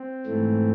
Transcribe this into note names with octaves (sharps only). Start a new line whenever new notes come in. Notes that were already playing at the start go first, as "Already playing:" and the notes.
Already playing: C4
G#2 E3 A3